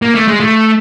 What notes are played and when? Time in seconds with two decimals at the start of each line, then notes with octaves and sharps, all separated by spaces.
0.02 A#3
0.15 A3
0.28 G#3
0.40 A3